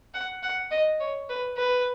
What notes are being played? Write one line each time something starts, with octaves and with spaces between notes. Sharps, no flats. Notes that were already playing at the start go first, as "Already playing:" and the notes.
F#5
F#5
D#5
C#5
B4
B4